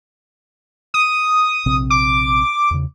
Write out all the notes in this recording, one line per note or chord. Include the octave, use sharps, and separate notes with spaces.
D#6
A#1 C3 C4
D6
E2 C#3